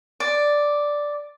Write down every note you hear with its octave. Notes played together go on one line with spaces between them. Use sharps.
D5